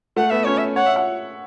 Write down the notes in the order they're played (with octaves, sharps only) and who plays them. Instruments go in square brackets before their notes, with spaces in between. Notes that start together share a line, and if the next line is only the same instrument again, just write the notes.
[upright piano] A3 [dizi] F#5
[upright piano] B3 [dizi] E5
[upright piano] C#4 [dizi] C#5
[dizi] E5
[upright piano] C#5 [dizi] F#5
[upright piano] E5
F#5